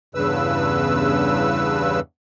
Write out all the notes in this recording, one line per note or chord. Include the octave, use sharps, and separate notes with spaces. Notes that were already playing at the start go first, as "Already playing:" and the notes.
E2 G2 C#3 B4 E6